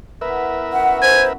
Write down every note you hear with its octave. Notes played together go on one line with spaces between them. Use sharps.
B3 E4 A#4 B4 E5
F#2 F#3 F#5
C5 G#5